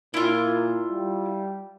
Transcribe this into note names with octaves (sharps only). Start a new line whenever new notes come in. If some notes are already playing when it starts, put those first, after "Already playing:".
A#2 E4 F4
G3